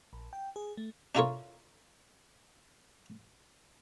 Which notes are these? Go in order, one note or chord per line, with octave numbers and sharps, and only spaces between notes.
A#1
G5
G#4
A3
D4 E4 F4 A4 A#4 C#5